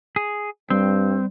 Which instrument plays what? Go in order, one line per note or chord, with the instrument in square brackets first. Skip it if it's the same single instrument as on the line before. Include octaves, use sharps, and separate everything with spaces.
[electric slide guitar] G#4
[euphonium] G2 [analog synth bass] G3 [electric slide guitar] C4